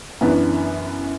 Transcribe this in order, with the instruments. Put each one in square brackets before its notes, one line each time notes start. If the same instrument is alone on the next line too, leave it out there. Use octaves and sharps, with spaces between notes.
[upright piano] F#2 E3 B3 D4